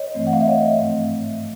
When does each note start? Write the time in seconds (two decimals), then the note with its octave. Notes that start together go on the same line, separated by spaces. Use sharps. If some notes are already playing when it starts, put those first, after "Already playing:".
Already playing: C#5 D#5
0.14 G2 E3 A3 C4
0.27 F#5
0.33 F5
0.40 E5
0.48 C#5 D#5
0.80 G#2 F3 A3 C4